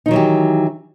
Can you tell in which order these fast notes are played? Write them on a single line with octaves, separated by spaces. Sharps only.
D#4 D#3 F#3 E3 G4